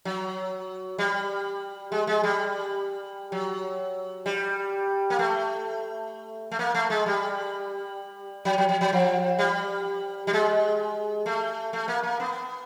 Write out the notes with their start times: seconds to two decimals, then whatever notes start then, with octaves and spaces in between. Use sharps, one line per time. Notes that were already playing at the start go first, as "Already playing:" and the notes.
0.05 F#3
0.99 G3
1.92 G#3
2.07 G#3
2.23 G3
3.32 F#3
4.26 G3
5.10 A#3
5.19 A3
6.51 A3
6.59 A#3
6.75 A3
6.90 G#3
7.06 G3
8.45 F#3
8.58 F#3
8.69 F#3
8.81 F#3
8.92 F3
9.39 G3
10.27 G3
10.33 G#3
11.26 A3
11.73 A3
11.88 A#3
12.03 A#3
12.20 B3